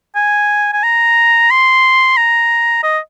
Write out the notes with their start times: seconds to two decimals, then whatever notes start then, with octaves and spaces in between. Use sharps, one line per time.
0.15 G#5
0.73 G#5
0.83 A#5
1.50 C6
2.17 A#5
2.83 D#5